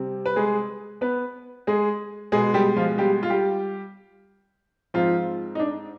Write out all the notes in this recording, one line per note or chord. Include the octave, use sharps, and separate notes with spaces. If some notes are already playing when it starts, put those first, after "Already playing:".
Already playing: C3 G3 C4
B4
G#3 G#4
B3 B4
G#3 G#4
B2 G#3 B3 G#4
G3 G4
F3 F4
G3 G4
F4
G3 G4
G#2 F3 C4 F4
D#4
D4